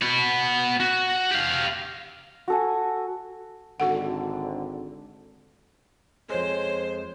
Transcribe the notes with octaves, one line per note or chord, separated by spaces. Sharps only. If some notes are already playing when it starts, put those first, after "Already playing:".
B3 F#4
F#4
G4 F5
F#4 A4 G#5
G#1 D3 F#4 A4 F#5
F2 G#3 C5 C#5